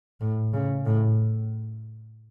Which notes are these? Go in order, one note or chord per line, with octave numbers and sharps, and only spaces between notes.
A2
C#3
A2